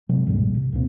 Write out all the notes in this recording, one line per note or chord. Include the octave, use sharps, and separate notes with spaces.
C3 F#3 G#3
D2 G2 A#2 G3
A#1
C3
C#2 A#2 C4